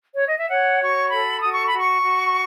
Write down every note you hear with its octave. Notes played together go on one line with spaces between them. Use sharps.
C#5
D#5
E5
C#5 F#5
F#4 C#6
A4 B5
F#4 D#6
C#6
B5
F#4
C#6
F#4